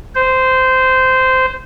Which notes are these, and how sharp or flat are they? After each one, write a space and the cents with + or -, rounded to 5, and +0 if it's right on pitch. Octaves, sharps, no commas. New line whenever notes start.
C5 -15